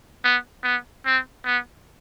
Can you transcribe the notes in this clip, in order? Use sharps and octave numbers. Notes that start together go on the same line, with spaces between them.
B3
B3
C4
B3